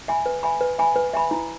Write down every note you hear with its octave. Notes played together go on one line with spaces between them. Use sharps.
E5 G#5 B5
B4
E5 G#5 B5
B4
E5 G#5 B5
B4
E5 G#5 B5
E4